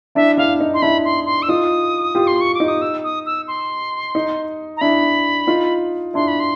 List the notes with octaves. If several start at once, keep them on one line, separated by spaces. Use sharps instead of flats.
D4 E4 E5
D4 E4 F5
D#4
C6
D4 E4 B5
C6
C6
E6
D#4 F4 D#6
F4 G4
C6
C#6
D6
D#4
D#6
E6
D#6
E6
C6
D#4
A#5
D4 E4 B5
D#4 F4
D4 E4 C6
B5
C6